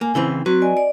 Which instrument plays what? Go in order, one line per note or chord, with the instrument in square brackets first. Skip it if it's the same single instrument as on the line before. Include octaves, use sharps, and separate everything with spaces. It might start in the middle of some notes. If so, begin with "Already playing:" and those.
[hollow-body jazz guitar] A#3 [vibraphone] G#5
[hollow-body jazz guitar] C#3 E3 C4 [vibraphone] E4
[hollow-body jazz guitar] F#3 [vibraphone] C4 F#4 B4
[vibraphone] D5 D#5 G#5
D5